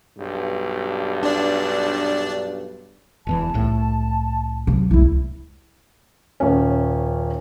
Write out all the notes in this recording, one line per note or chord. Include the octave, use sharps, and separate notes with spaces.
B1 G2
D4 D5
E1 E2 E3 A5
C2 A2
C3 F#3
F1 C#2 E4
D#1 C#4